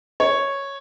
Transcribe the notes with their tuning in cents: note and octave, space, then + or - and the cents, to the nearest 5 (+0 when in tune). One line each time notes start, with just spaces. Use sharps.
C#5 -5